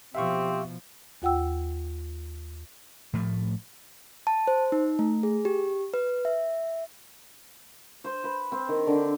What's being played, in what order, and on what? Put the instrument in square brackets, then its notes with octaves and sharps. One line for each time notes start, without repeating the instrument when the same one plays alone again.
[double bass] B2 F3 [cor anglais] C4 [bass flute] G4 [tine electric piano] E5 F5 C#6
[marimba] D#2 F4 F#5 G5 E6
[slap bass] A2 F3 A3
[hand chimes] A5
C5
D#4
A3
G#4
G4
B4
E5
[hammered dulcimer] C5
B4
C4
D#3
D3